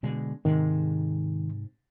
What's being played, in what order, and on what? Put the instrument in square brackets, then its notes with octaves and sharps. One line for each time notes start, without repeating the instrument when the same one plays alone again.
[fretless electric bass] B2 D3 G#3
[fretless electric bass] G#2 C3 G#3 [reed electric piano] D#3